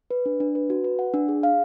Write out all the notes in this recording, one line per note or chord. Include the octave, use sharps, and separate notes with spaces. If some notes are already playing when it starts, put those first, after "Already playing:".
B4
D4
D4
B4
F#4
B4
F#5
D4
G#4
F5